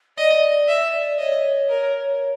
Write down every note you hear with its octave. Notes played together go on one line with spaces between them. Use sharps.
D5 D#5
E5
C#5 D#5
A#4